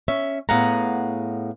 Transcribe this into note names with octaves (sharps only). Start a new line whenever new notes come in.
C#4 E5
A2 B3 G#4 F5 F#5 A#5